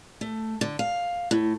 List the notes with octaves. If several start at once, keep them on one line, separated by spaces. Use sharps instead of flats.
A3
D3
F5
A2